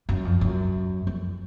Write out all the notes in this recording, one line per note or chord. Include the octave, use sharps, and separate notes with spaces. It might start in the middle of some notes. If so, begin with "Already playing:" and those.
F#2
F2
F#2
F2